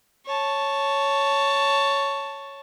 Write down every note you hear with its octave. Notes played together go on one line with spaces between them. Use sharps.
C#5 A5